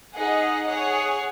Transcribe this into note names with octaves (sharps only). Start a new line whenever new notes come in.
D#4 G#4 D#5 F#5
G#4 C#5 F#5